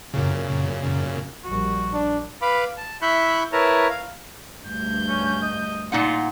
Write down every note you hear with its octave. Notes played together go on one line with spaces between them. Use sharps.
F#2 A#2 C#3
A#1 G3 F#4
D4
B4 F5 B5 D6
A5
E4 E5 B5 C#6 F#6 G6
E4 A#4 B4 C#5 A5 A#5
F5
D2 G2 G6
C#4
D#5
A#2 D#4 F4 F#5